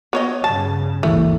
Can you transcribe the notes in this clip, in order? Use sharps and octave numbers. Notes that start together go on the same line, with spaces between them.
B3 C#5 D#5 D#7
G2 C#3 A5
G#1 D#2 E3 A3